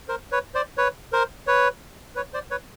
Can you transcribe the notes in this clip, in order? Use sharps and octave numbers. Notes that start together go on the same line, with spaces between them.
A#4 C5
B4 C#5
C5 D5
B4 C#5
A#4 C5
B4 C#5
B4 C#5
C5 D5
B4 C#5